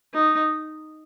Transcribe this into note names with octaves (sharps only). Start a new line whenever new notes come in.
D#4